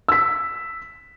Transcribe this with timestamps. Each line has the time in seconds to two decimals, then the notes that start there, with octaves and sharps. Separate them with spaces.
0.08 E6 B6